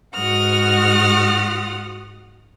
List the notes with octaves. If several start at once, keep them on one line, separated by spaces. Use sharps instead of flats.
G#2 F#4 F#5 D#6 F6